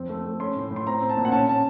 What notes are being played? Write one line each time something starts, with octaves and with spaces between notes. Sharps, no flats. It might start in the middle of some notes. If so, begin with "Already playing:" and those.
Already playing: F2 C4
A3
A3
C#4 C6
A2
A2
C6
C4 A#5
C4
A5
A#2
F#5
C#4 A5
C#4 A5